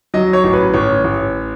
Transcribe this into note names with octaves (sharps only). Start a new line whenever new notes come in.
F#3 D#5
C#5
A1
B4
A1 C#5
A1